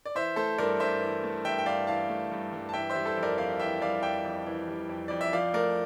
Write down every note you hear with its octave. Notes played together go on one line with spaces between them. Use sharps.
D5
E3 C5 E5
A3 A4 C5
G2 A#4 D5
G2 C5 E5
E3
A3
G2 E5 G5
G5
G2 D5 F5
E3 F5 A5
A3
G2
G2
A5
E3 E5 G5
C5 E5
G3
A4 C5
F2
A#4 D5
F2 D5 F5
E3 E5 G5
G3 D5 F5
F2 E5 G5
F2
E3
G3
F2
F2 D5
E5
F3 D5 F5
A3 A#4 D5